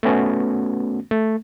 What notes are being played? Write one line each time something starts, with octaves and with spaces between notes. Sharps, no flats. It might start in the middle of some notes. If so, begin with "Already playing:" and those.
A3 B3 C#4 F#4
A3